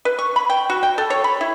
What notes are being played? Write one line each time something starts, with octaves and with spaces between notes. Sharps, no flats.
B4
C#6
B5
G5
F#4
G5
A4
C#5
B5
E4